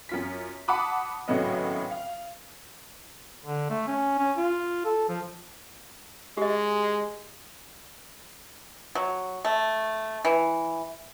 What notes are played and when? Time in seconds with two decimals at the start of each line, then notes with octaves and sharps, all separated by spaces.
0.09 F#2 F4 B6
0.68 F#5 A5 B5 D6 D#6 F#6
1.28 G#1 A2 C#3 F#3 B3 D#5
1.91 F5
3.45 D3
3.70 A3
3.87 C#4
4.18 C#4
4.37 F4
4.85 A4
5.09 F3
6.37 G#3 G4 D#5
8.95 F#3
9.45 A3
10.25 E3